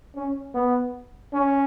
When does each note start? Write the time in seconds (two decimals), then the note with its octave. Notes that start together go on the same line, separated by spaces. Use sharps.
0.16 C#4
0.55 B3
1.34 C#4